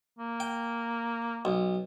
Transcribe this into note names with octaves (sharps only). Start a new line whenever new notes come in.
A#3
G5
B1